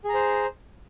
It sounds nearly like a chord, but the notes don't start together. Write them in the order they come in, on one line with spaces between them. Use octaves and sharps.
G#4 A#5 C5